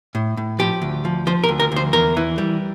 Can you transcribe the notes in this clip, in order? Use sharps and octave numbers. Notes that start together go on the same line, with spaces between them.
A2
A2
F3 G4
D2
F3
F3 C5
A#4
D2
A#4
D2 C5
E2 A#4
E3
G3